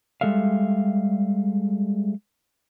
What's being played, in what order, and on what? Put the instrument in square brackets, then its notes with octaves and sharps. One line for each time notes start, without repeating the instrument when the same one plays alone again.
[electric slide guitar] G3 G#3 A4 E5 F5